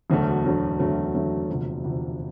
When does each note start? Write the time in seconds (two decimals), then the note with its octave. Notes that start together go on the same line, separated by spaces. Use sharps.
0.10 E1 D2 D3 F#3 A3
0.45 E1 D2 D3 F#3 A3
0.79 E1 D2 D3 F#3 A3
1.14 E1 D2 D3 F#3 A3
1.49 E1 D2 C3 F3
1.83 E1 D2 C3 F3